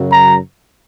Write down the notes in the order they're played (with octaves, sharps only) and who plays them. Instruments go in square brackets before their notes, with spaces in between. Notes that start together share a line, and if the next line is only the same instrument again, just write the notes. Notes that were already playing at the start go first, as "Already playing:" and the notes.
Already playing: [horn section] F#2 C#3 F#3
A#5